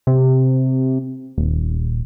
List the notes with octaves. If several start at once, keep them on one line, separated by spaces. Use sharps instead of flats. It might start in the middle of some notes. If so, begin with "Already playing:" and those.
C3
D#1